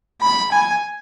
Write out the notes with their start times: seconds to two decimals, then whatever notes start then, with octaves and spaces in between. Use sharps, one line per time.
0.21 B5
0.52 G#5